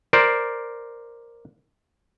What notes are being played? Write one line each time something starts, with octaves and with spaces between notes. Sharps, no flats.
A#4 C5 D5